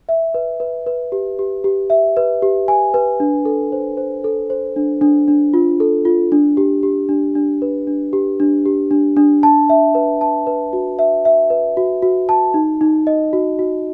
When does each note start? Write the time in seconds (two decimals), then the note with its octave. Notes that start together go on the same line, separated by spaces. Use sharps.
0.09 E5
0.34 B4
0.60 B4
0.87 B4
1.12 G4
1.39 G4
1.64 G4
1.90 E5
2.17 B4
2.42 G4
2.68 G#5
2.94 B4
3.20 D4
3.45 A4
3.72 C5
3.97 C5
4.24 A4
4.50 C5
4.76 D4
5.01 D4
5.28 D4
5.54 F4
5.80 A4
6.05 F4
6.32 D4
6.57 G4
6.83 G4
7.09 D4
7.35 D4
7.62 B4
7.87 D4
8.13 G4
8.40 D4
8.65 G4
8.91 D4
9.17 D4
9.43 A5
9.69 E5
9.95 B4
10.21 A5
10.47 B4
10.73 F#4
10.99 E5
11.25 E5
11.50 B4
11.77 F#4
12.02 F#4
12.29 A5
12.54 D#4
12.81 D#4
13.07 D#5
13.33 F#4
13.59 F#4